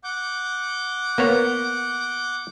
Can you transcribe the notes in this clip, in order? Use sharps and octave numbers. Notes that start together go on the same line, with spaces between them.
F#5 D6 G6
A#3 B3 C#5